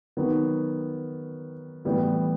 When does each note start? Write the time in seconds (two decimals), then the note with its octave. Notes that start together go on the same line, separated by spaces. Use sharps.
0.17 D#3 F#3 B3
1.85 A2 E3 G3 B3